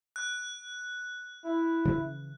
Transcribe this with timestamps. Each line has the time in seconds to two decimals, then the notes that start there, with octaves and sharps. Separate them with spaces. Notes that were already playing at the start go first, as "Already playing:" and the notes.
0.16 F#6
1.44 E4
1.85 C#3 E3 F3